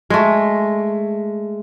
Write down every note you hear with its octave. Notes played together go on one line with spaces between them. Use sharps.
G#3 A3